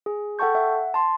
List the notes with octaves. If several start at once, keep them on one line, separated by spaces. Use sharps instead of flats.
G#4
A4 F#5 G5 A5 C#6 G6
E5 F#5
A5 C6